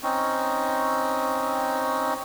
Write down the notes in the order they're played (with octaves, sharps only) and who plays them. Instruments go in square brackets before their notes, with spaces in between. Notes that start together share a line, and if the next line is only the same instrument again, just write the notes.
[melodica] C4 C#4 D#4